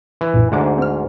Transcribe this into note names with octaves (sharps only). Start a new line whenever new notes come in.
E3
B1 F#2 A#2
D2 G#2 C5 F#5 D6
C4 F6